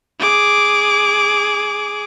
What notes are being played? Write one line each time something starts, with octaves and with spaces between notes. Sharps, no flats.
G#4 D6